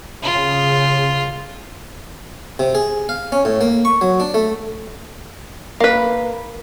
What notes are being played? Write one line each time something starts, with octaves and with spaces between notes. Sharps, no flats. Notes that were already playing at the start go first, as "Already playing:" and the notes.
C#3 F4
C3
G#4
F5
C#4
A2
A#3
C#6
F#3
D4
A3
A#3 B4